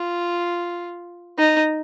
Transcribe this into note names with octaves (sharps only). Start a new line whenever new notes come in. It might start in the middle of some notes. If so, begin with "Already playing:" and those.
Already playing: F4
D#4